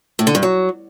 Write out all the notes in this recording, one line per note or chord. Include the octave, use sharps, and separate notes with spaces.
A2
D3
G2
F#3